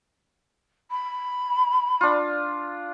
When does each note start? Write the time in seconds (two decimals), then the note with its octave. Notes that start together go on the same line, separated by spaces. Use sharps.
0.91 B5
2.01 D4 F4